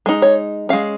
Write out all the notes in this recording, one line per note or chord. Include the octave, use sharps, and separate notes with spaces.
G#3 D#4
C#5
G#3 C#4 F5